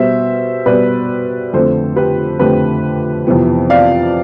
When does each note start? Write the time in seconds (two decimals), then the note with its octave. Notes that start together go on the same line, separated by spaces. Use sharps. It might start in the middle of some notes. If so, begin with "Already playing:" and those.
Already playing: B2 G3 B3 C5 E5
0.66 B2 G3 B3 B4 D5
1.53 F2 D3 A3 C4 A4 C5
1.96 G4 B4
2.39 F2 D3 A3 C4 G4 B4
3.27 F2 C3 E3 B3
3.70 D5 F5